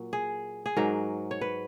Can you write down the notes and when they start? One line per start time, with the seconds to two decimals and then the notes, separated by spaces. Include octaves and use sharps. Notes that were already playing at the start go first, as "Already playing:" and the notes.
Already playing: A#2 F#3
0.13 G#4
0.66 G#4
0.77 G#2 F#3 A#4
1.31 C#5
1.41 B4